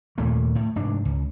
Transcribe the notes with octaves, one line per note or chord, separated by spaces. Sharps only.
D#2 A#2 A3 A#3
A2
F1 G#2 D4
C#2